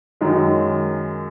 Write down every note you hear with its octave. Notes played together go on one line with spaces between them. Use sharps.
F#2 D#3 G#3